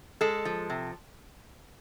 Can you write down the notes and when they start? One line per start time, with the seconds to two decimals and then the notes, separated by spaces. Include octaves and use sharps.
0.21 G#3 A4
0.45 F3
0.70 C3